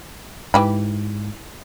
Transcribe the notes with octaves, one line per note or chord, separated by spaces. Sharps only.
G#2 E3 G4 B5